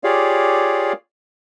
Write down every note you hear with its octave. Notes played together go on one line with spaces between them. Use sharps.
F4 G4 G#4 C#5 D5 F5